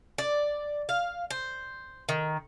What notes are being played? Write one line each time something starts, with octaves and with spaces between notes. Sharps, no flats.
D5
F5
C5
D#3